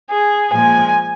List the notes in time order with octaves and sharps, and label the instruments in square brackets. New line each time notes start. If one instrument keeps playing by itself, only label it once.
[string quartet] G#4
A#2 F3 G#3 G#5